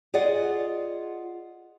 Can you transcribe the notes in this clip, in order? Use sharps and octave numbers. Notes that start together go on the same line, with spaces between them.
F4 G#4 D5 D#5 F#5